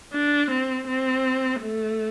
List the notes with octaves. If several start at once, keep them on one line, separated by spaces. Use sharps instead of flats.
D4
C4
C4
A3